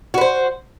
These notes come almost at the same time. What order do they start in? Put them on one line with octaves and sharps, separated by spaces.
F#4 B4 C5